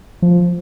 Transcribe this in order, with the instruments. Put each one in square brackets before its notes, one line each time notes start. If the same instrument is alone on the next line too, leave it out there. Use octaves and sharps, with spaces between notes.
[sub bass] F3